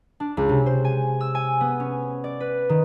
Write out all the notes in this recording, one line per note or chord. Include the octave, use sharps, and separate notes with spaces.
D4
C#2
C3
C5
G#5
E6
G#5
B3
C#4
D5
B4
D#3